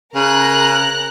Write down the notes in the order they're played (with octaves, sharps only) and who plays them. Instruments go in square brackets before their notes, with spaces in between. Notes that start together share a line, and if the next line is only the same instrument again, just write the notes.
[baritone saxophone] C#3 [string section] A#4 A#5 F#6